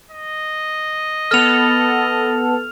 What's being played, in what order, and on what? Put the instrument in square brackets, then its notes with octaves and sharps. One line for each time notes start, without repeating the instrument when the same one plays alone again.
[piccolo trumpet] D#5
[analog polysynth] B3 A4 [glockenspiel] F6 F7